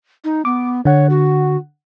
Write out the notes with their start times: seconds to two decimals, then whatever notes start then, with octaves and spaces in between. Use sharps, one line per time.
0.24 D#4
0.45 B3 D6
0.85 D3 C#5 F#5
1.09 F#4